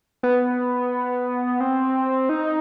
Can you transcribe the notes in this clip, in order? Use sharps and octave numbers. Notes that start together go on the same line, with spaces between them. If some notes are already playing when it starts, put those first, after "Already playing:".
B3
C4
D#4